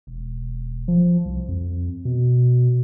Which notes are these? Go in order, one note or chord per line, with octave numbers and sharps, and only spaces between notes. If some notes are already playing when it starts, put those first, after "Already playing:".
E1
F3
C2
F2
B2